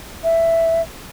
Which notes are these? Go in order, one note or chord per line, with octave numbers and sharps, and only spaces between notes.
E5